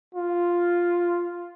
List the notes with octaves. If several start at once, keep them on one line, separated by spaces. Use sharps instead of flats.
F4